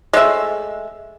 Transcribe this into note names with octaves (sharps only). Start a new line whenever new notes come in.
G#3 A3 E5